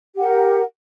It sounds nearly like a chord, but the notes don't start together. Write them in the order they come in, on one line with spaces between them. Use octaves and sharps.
G4 F#5 A#4